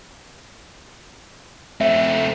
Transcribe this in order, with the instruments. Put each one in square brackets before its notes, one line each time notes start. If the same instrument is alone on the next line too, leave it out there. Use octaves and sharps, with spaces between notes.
[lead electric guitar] A3 C4 [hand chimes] E5